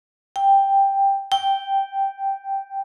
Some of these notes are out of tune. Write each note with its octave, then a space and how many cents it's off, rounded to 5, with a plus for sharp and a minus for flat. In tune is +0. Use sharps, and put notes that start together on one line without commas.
G5 +5
G5 -5